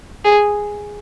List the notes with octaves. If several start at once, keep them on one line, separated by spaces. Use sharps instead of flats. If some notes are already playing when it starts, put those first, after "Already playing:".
G#4